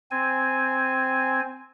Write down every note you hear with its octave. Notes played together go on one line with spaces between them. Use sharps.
C4 G#5